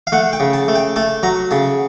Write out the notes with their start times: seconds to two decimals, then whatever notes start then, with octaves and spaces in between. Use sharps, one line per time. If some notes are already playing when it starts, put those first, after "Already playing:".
0.07 F5
0.12 A3 F#5
0.33 G5
0.40 C#3
0.53 A5
0.68 A3
0.75 G5
0.96 A3 A5
1.23 F#3 A#5
1.51 C#3 A5